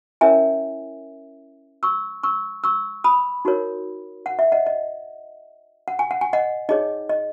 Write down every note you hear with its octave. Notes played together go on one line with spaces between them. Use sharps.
C#4 E4 A#4 C#5 E5 G#5
C#6 E6
C#6 E6
C#6 E6
B5 D#6
D#4 F#4 A#4 C#5
F#5
E5
D#5 F#5
D#5
F#5
G#5
F#5
G#5
D#5 F#5
D#4 G#4 C#5 D#5
D#5